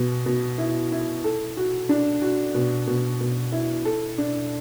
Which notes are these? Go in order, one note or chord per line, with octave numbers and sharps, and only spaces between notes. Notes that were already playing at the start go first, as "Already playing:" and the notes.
Already playing: B2
B2
E4
E4
A4
F#4
D4
F#4
B2
B2
B2
E4
A4
D4